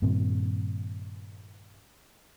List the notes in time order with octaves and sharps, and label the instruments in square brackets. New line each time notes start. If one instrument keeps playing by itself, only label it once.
[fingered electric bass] G2 A#2 D#3 C4